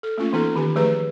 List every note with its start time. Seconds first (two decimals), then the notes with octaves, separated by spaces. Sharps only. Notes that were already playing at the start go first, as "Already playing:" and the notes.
0.03 A4
0.18 A3 A#3 C#4 F4
0.33 E3 B3 D#4 A4
0.56 D#3 G4 G#5
0.76 F3 A3 G#4 B4 A#5